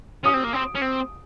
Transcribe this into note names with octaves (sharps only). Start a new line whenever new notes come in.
C#4 D#6
C4
A#3
C4
C#4
C4